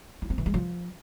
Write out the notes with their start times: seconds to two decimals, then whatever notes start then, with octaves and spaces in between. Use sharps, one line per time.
0.22 E4
0.30 C4
0.38 E3
0.46 G#3
0.54 F3